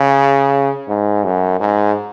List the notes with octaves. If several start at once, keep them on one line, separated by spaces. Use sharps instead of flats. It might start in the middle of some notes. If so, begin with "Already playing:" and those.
Already playing: C#3
G#2
F#2
G#2